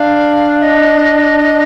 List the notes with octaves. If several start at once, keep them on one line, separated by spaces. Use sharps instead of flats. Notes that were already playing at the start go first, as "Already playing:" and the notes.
Already playing: D4 F5
F5
D#5